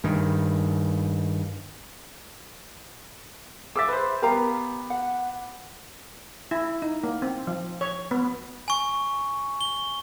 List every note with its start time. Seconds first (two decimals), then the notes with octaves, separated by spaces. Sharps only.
0.04 G2 D#3
3.76 G#4 E5 D6 E6 A6
3.88 B4 C5
4.22 B3 G4 A#4 F5 A#5
4.90 F#5
6.51 E4
6.82 D#4
7.04 A#3
7.22 C4
7.47 F3
7.81 C#5
8.11 B3
8.68 G#5 C#6
9.61 G7